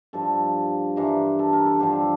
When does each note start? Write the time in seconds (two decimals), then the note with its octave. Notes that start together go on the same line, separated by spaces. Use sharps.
0.13 G2 F3 A4
0.96 G2 E3 A#4
1.39 A4
1.53 A#4
1.66 A4
1.79 G2 D3 F3 G4